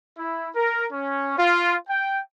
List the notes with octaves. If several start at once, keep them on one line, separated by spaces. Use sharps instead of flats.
E4
A#4
C#4
F4
G5